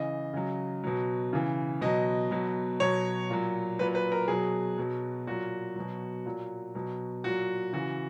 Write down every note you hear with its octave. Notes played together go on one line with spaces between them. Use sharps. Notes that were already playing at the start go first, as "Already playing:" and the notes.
Already playing: C#3 E3 D#5
C#3 F#3
B2 F#3
C#3 E3
B2 F#3 D#5
B2 F#3
B2 F#3 C#5
A#2 F#3
A#2 F#3 B4
B4
A#4
B2 F#3 G#4
B2 F#3
A#2 F#3 F#4
B2 F#3
A#2 F#3
B2 F#3
A#2 F#3 F#4
C#3 E3 F#4